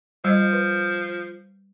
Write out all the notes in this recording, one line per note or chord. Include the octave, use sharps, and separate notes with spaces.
F3 G3 C5 D#5
B4